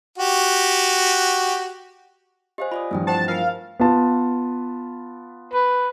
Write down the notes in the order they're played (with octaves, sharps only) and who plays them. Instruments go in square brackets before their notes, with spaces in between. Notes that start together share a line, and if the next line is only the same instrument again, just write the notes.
[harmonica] F#4 G4
[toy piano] G4 C5 [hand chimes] D#5 F5 G#5
[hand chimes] F4 D5 D#6 [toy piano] B5
[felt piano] G2 E3 F3 [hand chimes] A3 C4 G5
[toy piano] G4 C5 F#5 [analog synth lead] A5
[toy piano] F4 A#4 G#5 [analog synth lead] F5
[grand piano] B3 F4 A5
[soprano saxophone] B4